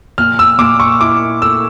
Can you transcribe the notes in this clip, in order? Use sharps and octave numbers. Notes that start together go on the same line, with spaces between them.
A#2 F6
E6
A#2 D6
C#6
E4 D6
A3 E6